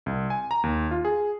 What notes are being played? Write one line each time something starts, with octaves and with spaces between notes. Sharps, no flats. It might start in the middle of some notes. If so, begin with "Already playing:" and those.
C2
G#5
A#5
D#2
F4
G#4